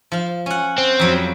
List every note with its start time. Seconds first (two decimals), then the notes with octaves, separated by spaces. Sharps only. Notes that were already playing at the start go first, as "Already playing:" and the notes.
0.12 F3 F5
0.46 C#4 F#5
0.78 C4
1.00 F2 F#3 G3